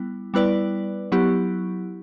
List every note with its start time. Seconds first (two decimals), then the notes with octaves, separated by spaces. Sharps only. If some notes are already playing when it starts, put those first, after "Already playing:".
Already playing: G3 B3 E4
0.34 G3 B3 E4 B4 D5
1.12 F#3 B3 E4 G4